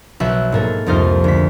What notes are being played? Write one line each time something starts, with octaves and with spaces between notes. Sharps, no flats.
B1 E5 F#6
G#2 A#3 A4
C2 F2 D#4 C5 F6
D2 B6